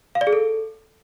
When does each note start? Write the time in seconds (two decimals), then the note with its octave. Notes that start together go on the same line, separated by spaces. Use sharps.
0.15 F5
0.21 D5
0.27 G#4
0.33 A4